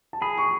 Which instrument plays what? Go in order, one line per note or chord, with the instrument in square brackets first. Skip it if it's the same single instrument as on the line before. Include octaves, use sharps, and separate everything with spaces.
[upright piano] A5
[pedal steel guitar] G#4 [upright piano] B5
[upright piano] C#6